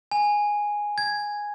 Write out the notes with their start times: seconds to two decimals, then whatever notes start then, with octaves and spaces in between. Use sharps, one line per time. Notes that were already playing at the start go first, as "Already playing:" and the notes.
0.11 G#5
0.98 G#6